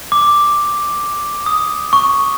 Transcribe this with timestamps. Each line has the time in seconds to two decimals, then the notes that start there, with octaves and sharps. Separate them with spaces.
0.12 D6
1.46 D#6
1.93 C#6